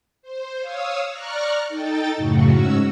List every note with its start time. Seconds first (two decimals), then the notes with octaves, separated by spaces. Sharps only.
0.22 C5
0.59 C#5 F5 D#6 E6
1.09 D5 A#5 C#6 F6 F#6
1.68 D#4 A4 G5 A6
2.16 F#2 A2 C#3 F#3 F#4
2.50 G#2 C#4 F#4 E6